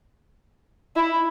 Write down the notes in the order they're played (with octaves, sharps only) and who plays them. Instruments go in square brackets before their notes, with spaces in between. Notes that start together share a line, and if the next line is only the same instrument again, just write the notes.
[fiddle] E4